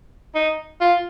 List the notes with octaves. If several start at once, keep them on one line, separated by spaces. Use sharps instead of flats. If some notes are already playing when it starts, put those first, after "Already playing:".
D#4
F4